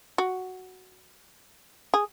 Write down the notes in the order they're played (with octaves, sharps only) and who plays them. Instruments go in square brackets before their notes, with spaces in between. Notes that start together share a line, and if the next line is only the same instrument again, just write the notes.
[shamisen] F#4
G#4